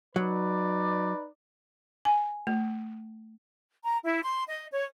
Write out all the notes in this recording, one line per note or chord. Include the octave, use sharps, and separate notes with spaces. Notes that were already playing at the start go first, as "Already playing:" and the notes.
F#3 D#4 B4 D5
G#5
A3
A#5
E4
C6
D#5
C#5